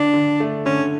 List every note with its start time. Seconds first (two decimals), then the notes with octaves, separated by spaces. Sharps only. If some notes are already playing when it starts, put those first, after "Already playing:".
Already playing: D3 D4
0.13 D3
0.40 A3
0.66 D3 C#4